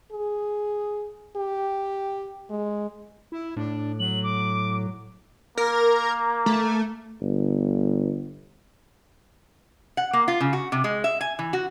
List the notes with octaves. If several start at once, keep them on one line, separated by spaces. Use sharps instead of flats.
G#4
G4
G#3
E4
A2 D4
F#3 F#7
D6
A#3 A#4
A3
G1
F#5
A#3
F4
C#3
F#4
C3
G#3
E5
G#5
E3
F#4